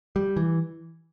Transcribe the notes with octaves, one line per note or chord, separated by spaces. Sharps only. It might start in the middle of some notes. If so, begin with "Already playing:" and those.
G3
E3